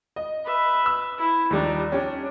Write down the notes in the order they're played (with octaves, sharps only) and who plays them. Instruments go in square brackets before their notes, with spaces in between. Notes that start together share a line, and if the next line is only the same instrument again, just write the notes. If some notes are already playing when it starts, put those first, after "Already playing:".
[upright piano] D#5
[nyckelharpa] B4 E5
[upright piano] E6
[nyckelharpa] E4
[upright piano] D#2 F3 G3 [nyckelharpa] D4 D#4
[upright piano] C#4 G4 [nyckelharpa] D4